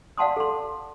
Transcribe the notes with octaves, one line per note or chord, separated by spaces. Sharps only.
D5 F5 F#5 A5 C6 D#6
A4 C6